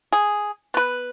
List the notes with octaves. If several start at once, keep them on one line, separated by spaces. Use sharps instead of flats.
G#4
B3 B4